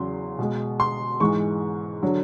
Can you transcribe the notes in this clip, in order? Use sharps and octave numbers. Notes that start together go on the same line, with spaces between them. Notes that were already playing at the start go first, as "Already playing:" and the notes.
Already playing: E2 C#3 F#3 C6
B2 G#3
C6
G#2 E3 G#3 C#6
D3 F#3